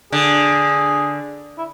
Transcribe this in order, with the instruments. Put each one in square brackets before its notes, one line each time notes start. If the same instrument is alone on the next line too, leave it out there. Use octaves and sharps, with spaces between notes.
[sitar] D3 [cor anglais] G#4
[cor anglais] E4